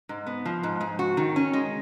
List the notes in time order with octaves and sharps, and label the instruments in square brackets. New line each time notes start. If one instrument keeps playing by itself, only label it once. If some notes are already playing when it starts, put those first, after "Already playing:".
[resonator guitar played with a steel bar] G#2
B3
F3
G#2
G#2
F#4
D#3
C#4
G#3